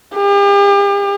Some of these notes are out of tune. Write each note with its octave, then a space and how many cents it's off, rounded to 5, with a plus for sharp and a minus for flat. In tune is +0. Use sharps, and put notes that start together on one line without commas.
G4 +40